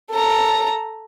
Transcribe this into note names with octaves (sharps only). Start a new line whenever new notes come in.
A4 A#5